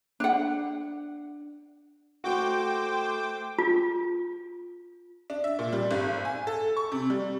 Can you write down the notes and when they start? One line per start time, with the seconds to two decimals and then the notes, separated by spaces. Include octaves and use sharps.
0.20 D4 F#5
2.24 A3 F#4 C5 G5 D6
3.59 F4
5.30 D4
5.44 E5
5.59 A#2
5.73 G3
5.91 G#1
6.25 G#5
6.47 A4
6.77 C#6
6.92 C3
7.10 G3